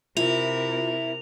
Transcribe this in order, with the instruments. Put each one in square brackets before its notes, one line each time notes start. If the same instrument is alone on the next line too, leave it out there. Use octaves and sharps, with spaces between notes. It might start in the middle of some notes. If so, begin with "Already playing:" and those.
[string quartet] C3 A#4 [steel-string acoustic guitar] E4 [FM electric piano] F4 E5 [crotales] F7